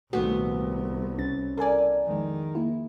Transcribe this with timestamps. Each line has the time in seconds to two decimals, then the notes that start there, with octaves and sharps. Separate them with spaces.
0.13 C2 A#2 D#3 A3 B3 F#4
1.18 C#2 C#4 A6
1.57 E2 A4 A#4 D5 G#5
2.07 F2 D#3 G#3
2.55 A#3 E4